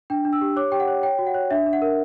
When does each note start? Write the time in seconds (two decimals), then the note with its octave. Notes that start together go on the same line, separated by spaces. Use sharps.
0.10 D4 G5
0.25 D4
0.33 E6
0.41 G4
0.57 C#5 D6
0.72 G4 G5
0.80 F#5
0.88 C#5
1.03 C#5 G5
1.19 F#4
1.27 F#5
1.34 C#5
1.51 D4 E5
1.66 D4
1.73 F#5
1.82 A#4